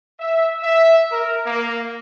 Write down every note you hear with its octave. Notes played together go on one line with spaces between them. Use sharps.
E5
E5
A#4
A#3